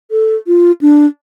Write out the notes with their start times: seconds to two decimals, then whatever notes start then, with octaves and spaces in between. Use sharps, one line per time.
0.11 A4
0.47 F4
0.81 D4